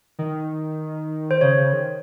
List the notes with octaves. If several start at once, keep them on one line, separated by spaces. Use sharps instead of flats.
D#3
C5
C#3 C#5
C#3
D#3